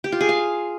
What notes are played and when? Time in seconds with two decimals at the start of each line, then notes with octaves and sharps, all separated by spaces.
0.04 G4
0.12 F4
0.21 G#4
0.29 F5